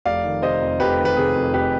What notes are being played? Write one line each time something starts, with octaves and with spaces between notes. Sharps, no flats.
F1 D5 F5
D#3
C3 C5 D#5
F2
F1 G4 B4
D#3
B4
C3 G#4
F2
F1 G4 B4